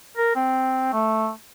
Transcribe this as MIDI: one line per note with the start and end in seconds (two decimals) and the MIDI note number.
0.17 0.33 70
0.36 0.88 60
0.93 1.30 57